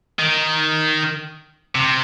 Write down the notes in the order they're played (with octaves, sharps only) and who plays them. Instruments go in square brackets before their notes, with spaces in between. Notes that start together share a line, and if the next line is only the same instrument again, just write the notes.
[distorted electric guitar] D#3
C3